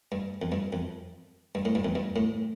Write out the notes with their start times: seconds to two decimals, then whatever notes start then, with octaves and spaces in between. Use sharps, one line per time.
0.12 G2
0.42 F2
0.52 G2
0.73 F2
1.55 G2
1.65 A2
1.75 G2
1.85 F2
1.95 G2
2.16 A2